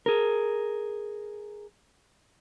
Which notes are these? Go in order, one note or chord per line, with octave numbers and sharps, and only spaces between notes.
G#4 A#4